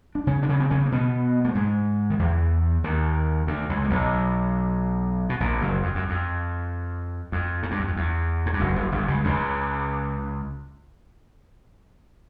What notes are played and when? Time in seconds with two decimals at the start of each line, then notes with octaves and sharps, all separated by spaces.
0.15 D4
0.27 C#3 C#4
0.43 D4
0.49 C#3 C#4
0.60 C4
0.70 C#3 C#4
0.85 A#3
0.92 B2 B3
1.45 A3
1.55 G#2 G#3
2.10 D#3
2.19 E2 E3
2.84 D#2 D#3
3.47 D2 D3
3.69 C#2 C#3
3.84 A#2
3.90 B1 B2
5.29 B2
5.40 A#1 A#2
5.61 F#1 F#2
5.83 F2
5.95 F#2
6.09 F2
7.32 F2
7.63 G#2
7.71 G2
7.80 F#2
7.87 F2
7.96 E2
8.46 G#2
8.53 G2
8.60 F#1 F#2
8.76 F#1 F#2
8.92 G1 G2
9.08 C#2 C#3
9.24 C#2 C#3